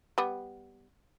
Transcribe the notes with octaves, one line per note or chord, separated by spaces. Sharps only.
G3 B3